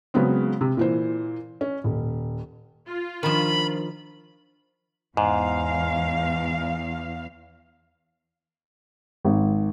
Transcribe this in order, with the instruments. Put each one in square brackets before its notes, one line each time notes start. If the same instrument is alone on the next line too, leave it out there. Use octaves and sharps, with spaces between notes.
[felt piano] C#3 F#3 G#3 B3 C4
C3
A#2 E3 C5
C#4
D#1
[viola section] F4
[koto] D#3 F3 [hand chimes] D4 A#4 [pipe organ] B5
[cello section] E2 F5 [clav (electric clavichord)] G#2
[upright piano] G#1